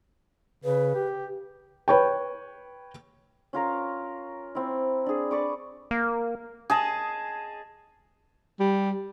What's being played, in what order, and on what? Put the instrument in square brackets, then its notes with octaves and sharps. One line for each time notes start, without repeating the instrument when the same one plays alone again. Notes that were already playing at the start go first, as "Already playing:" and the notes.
[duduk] C#3 [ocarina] B4
[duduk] G4
[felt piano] B4 C#5 G5
[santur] C#4 F4 A#4 A#5
C4 E4
D4 G#4
B4 D5 C#6 D6
[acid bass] A#3
[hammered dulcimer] G#4 D#5 A5
[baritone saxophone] G3